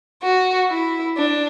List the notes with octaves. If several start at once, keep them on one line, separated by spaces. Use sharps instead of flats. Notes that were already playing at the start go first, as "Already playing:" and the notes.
F#4
E4
D4